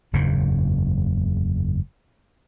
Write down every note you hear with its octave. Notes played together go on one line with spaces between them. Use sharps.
F#1 E2 G#2 C#3